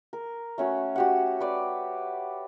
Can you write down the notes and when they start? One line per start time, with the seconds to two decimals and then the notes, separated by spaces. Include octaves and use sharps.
0.13 A#4
0.58 A3 C#4 F#4
0.96 F#4 G4 F#5
1.40 B4 D5